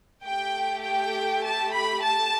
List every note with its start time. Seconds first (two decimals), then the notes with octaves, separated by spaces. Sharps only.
0.24 A3 G4 G5
0.84 G5
1.44 A5
1.74 B5
2.04 A5